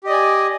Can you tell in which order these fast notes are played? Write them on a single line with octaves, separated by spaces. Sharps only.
G4 D#5 D5 G#5